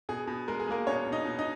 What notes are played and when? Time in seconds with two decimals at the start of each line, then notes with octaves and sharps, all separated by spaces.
0.09 B2 G#4
0.27 B2
0.48 G#3 A#4
0.60 G#4
0.68 G#3 A#3 A#4
0.87 B2 C#4 C#5
1.06 B2
1.12 D#4 D#5
1.25 B2
1.39 D#4 D#5